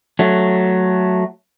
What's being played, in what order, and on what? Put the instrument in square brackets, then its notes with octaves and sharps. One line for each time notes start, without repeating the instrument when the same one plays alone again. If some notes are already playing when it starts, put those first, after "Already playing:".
[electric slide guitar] F#3 A3